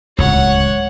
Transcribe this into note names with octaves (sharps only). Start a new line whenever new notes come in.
D1 C#2 C#5 F#5